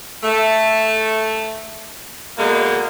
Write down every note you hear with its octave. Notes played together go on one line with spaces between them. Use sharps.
A3
B2 D3 G#3 A#3